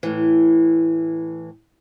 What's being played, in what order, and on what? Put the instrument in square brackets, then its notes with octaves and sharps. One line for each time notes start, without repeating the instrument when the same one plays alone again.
[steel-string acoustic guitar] A2 E3